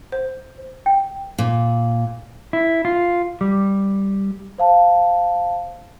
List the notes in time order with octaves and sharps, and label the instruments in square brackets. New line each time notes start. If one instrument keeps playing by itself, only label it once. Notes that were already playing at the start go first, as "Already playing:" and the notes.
[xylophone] C5
[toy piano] G5
[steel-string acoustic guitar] A#2
[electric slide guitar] E4
F4
G3
[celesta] C5 F5 A5